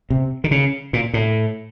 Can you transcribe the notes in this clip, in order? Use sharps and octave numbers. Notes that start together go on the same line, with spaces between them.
C3
D#3
C#3
A#2
A2